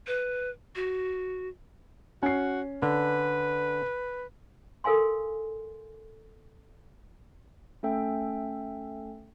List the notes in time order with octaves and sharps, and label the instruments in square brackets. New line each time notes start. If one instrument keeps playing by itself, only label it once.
[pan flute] B4
F#4
[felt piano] C#4 C7 [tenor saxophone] F#4
[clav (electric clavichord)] D3 [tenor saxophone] B4
[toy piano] A4 A#4 F5 G#5 C6
[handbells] A3 C#4 A4 E5 G5